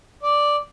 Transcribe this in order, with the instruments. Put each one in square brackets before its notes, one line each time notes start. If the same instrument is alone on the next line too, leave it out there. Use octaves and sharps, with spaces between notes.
[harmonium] D5